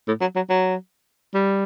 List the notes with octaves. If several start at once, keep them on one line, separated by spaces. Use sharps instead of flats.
A2
F#3
F#3
F#3
G3